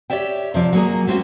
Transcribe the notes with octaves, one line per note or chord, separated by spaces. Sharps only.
G4 C#5 D5 E5 G5
C3 F3 D5
F#3 A#3 G#4
G3 C4 C#4 F4 F#4